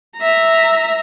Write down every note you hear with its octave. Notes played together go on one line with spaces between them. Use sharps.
E5 A#5